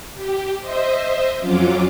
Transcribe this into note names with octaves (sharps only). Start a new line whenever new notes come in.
G4
C5 D#5 E5
F2 F#3 C#4 F4 D6